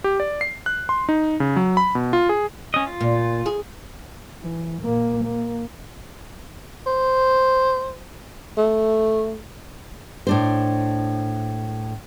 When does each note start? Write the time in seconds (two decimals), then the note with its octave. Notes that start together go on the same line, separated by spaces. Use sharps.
0.04 G4
0.20 D5
0.41 C7
0.66 F#6
0.89 C6
1.09 D#4
1.40 C#3
1.56 F#3
1.77 B5
1.95 B2
2.13 F4
2.29 G#4
2.74 C#4 D#5
2.87 F4
3.01 A#2
3.46 G#4
4.43 E3
4.83 A#2 A#3
5.24 A#3
6.86 C5
8.57 A3
10.27 A2 D4 C5